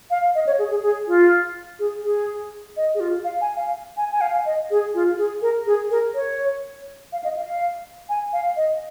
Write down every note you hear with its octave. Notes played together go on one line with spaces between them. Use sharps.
F5
D#5
C#5
G#4
G#4
G#4
F4
G#4
G#4
D#5
G#4
F4
F5
G#5
F5
G#5
G#5
F5
D#5
G#4
F4
G#4
A#4
G#4
A#4
C#5
F5
D#5
F5
F5
G#5
F5
D#5